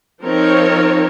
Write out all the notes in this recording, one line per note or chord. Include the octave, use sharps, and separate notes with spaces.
F3 C4 D#4 A#4 C#5